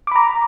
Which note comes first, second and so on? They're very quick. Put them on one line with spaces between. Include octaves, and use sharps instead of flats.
D6 B5 A#5